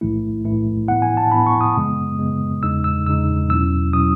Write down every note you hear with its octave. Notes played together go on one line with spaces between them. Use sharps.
B1 A2 E3 A3 E4
B1 A2 E3 A3 E4
A2 E3 B3 E4 F#5
G#5
A5
A2 E3 B3 E4 B5
C#6
D#6
F#2 C#3 G#3 B3
F#2 C#3 G#3 B3
E2 C#3 G#3 D#4 E6
E6
E2 C#3 G#3 D#4 E6
E2 B2 F#3 C#4 E4 E6
B2 F#3 C#4 E4 D#6